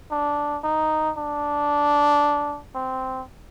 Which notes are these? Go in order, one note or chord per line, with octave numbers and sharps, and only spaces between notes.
D4
D#4
D4
C4